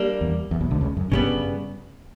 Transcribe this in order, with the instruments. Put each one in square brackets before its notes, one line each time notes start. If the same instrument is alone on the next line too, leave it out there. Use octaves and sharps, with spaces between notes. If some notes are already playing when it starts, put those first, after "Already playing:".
Already playing: [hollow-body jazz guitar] G3 A#3 D4
[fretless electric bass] E2
E2
B1 B2
D2 D3
C#2 C#3
F#2
[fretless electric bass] G1 G2 [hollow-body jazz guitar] C#3 G3 B3